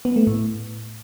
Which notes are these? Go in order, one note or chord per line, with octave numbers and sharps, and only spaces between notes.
B3
A3
A2